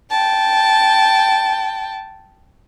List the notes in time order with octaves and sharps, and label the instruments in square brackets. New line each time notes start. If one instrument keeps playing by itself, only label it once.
[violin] G5 A5